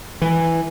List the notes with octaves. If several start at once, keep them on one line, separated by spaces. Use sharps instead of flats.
E3